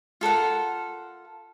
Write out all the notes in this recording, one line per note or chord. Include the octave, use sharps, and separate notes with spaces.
F4 A4 A#4 F#5